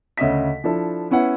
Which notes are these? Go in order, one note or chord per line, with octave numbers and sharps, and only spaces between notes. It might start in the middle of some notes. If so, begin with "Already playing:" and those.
D2 C#3 D#5 E5 B6
F3 D4 E4 A4
B3 C#4 E4 B4 F#5